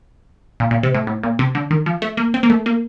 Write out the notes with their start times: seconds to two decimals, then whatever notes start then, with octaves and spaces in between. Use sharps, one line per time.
0.60 A#2
0.71 A#2
0.83 C3
0.95 A2
1.07 A2
1.23 A#2
1.39 C3
1.55 D3
1.71 D#3
1.86 F3
2.02 A3
2.17 A#3
2.34 C4
2.43 A#3
2.50 A3
2.66 A#3